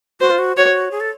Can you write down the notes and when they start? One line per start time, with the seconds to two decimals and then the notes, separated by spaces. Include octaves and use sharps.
0.20 F#4 C5
0.30 F4
0.38 F#4
0.57 F#4 C#5
0.91 G#4
1.00 A4